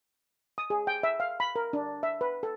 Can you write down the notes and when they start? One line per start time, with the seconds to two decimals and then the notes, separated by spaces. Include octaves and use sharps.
0.58 D#6
0.70 G#4
0.87 G5
1.03 E5
1.20 F5
1.40 B5
1.56 A#4
1.73 D4
2.03 E5
2.21 B4
2.43 A4